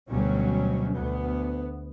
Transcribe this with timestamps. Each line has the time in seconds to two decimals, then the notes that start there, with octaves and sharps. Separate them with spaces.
0.10 D2 B2 F#3 G3 C#4
0.94 D2 B3